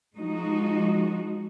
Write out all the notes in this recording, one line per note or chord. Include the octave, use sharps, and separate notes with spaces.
F3 G#3 D#4 F#4